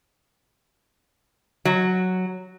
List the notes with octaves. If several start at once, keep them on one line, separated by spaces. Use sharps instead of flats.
F#3